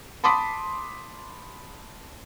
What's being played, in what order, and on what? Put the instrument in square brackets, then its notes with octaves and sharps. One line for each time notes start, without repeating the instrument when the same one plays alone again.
[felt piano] A5 B5 C6 D6 D#6 B6